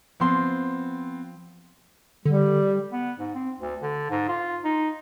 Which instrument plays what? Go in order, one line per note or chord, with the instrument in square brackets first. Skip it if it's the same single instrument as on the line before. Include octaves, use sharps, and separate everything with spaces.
[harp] F3 C6 [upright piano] B3 C4
[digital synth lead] D3 [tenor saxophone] G3
[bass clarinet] B3
G#2
C4
D2
D3
G#2
F4
D#4